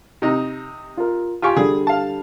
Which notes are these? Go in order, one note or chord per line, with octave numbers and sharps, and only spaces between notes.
C3 D#4
F4 A#4
F4 G4 G#5 C6 C#6
D3 G3 G#4
F5 A5